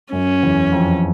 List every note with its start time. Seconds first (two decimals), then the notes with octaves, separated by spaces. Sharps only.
0.12 F#2 C#4
0.43 E2
0.72 F2